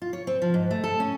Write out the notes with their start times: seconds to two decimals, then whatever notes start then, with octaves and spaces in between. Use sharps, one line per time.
0.02 F4
0.13 C#5
0.27 C4
0.42 F3
0.54 G#2
0.71 A3
0.84 A4
1.00 C#4